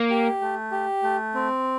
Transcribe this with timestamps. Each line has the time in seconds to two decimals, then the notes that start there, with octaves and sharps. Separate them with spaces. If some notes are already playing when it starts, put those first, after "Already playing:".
Already playing: A#3
0.10 G4
0.41 A3
0.72 G4
1.03 A3
1.34 C4